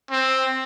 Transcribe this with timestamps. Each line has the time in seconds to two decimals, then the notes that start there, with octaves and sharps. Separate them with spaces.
0.11 C4